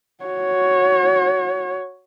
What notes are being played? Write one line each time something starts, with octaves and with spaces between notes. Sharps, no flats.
F#4 C#5